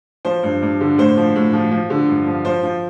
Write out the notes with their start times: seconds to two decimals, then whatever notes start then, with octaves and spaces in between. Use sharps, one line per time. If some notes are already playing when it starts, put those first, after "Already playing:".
0.25 F3 C5
0.43 G2
0.62 G2
0.81 D3
0.98 A2 C5
1.17 F3
1.36 A2
1.53 F3
1.71 F3
1.90 D3
2.09 G2
2.27 F3
2.45 F3 C5
2.63 F3